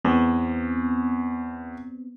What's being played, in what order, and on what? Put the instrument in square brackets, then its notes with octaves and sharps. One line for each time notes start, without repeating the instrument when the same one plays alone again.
[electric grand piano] E2 [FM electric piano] B3 C4